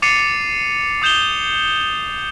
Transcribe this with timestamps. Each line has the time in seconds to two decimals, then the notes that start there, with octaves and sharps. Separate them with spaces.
0.02 D6 A6 C7 C#7 D#7 F7
1.02 D6 D#6 G6 E7 F7 G7